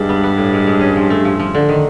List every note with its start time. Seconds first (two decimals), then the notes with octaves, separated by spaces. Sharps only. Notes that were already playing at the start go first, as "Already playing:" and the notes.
Already playing: G2 G#3
0.09 B3
0.24 B3
0.37 A2
0.53 G#3
0.67 G#3
0.81 C#4
0.96 F3
1.10 A3
1.25 F3
1.39 F3
1.55 D3
1.69 D#3